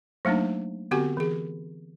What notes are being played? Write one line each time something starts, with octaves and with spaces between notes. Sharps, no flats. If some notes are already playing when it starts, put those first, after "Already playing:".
F#3 A3 A#3 D4 D#4
D3 B3 C4 F#4 G4 G#5
E3 G#4